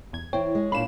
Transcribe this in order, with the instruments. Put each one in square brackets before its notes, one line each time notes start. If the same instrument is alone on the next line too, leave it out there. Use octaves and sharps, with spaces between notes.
[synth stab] E2 G#6
[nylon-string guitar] E3 E4 C5 [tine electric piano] C#5 [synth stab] G5
[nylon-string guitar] G#3
[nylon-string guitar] A#2 D4 F5 [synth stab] B5 E7